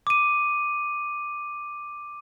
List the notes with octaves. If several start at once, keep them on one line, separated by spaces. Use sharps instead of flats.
D6 D#7